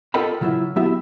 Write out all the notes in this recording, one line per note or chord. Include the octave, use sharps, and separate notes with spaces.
F4 A4 A#4 D#5 G5 B5
C#3 F#3 E4 F4 E5
F#3 B3 E4 G4 E5